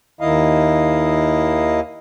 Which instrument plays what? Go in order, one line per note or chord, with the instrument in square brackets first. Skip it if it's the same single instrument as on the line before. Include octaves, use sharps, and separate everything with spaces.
[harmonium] D#2 D#3 E4 D#5 F5